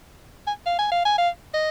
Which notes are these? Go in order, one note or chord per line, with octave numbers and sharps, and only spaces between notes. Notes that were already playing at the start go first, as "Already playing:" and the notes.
G#5
F5
G#5
F5
G#5
F5
D#5